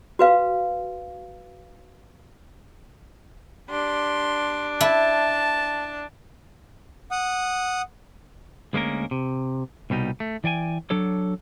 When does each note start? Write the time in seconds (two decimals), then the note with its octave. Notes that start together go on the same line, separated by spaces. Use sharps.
0.19 F#4 B4 F5
3.69 D4 G4 C6
4.81 E4 A5
7.11 F#5 D#6
8.73 D2 G#3 A#3 C#4 A#4
9.11 C3
9.90 C2 B2 G3 D#4
10.20 A3
10.44 E3 D5 G5 G#5
10.90 F#3 D4 A4 C#5